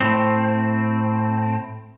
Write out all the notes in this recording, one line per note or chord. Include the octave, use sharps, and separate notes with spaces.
A2 C4